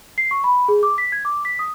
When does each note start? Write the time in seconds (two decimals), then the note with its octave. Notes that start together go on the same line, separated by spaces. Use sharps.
0.18 C7
0.31 C#6
0.44 B5
0.68 G#4
0.83 D6
0.98 B6
1.12 G#6
1.25 D6
1.45 B6
1.59 D#6